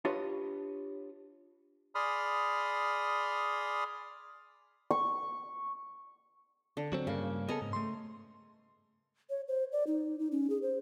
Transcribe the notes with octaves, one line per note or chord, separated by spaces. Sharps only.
D4 F4 G4 B4 C#5 D#5
G#4 D5 B5 C6 D#6 F6
C#6
D3
F#3 C4
G2 C#3 A#3
B3 G#4 A4 D#5 A#5
G#2
A3 C6
C#5
C5
D5
D#4
D#4
C#4
G#4
C5